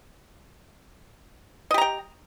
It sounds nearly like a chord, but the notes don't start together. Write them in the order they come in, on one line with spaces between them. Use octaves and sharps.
D#5 G4 A#5 G5